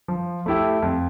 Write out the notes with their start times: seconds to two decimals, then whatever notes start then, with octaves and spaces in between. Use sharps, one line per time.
0.08 F3
0.46 A3 E4 G4
0.82 F2